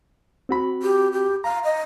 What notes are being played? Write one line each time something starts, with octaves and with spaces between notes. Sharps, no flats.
C4 F#4 B5
G4
G4
F5 A#5
D#5